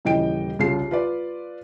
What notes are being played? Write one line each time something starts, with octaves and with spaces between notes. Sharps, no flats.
D#1 C#3 E3 D#5 G5 D7
C2 C#3 F4 G#4 C7
F4 B4 D5